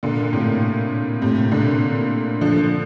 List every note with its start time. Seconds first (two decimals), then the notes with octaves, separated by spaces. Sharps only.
0.03 A#2 D3
0.33 A2 C3
1.22 A2 C3
1.51 A#2 D3
2.41 D3 F3